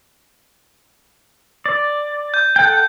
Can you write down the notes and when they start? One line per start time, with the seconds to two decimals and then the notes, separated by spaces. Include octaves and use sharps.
1.66 D5
2.34 G6
2.56 A4 F#5 G5